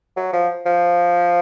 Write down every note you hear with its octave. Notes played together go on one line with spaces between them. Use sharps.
F#3
F3
F3